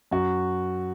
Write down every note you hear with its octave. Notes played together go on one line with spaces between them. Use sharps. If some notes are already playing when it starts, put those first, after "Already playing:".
F#2 F#4